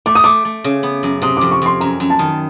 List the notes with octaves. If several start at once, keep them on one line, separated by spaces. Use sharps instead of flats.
A3 D6
D#6
A3 D6
A3
C#3
B3
F#2
C3 D#6
F2 D6
C#6
F2 C6
F#2 A#5
F#2
A5
D#3